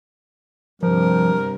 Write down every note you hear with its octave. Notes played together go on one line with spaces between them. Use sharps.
G2 C3 F3 A#4